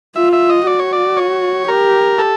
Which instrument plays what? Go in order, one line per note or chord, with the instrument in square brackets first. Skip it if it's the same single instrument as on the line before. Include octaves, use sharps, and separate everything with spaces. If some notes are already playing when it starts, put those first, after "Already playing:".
[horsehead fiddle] F4 [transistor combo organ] E5
[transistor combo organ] E5
D#5
[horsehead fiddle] F#4 [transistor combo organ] D5
[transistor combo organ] C#5
D5
C#5
[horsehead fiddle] G4 [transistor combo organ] A#4
[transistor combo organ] A4